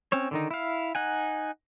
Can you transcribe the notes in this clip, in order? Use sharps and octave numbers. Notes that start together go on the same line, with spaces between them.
C4 C#4 C#5
D3 D#3 D#4
E4 F5
D#4 F#5 G#5